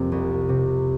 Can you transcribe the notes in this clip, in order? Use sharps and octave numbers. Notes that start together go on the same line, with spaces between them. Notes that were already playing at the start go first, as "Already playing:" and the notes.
Already playing: F2 C3 A#3 C4
C2
C3